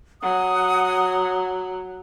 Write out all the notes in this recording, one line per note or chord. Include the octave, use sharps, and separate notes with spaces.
F#3 F#5 D#6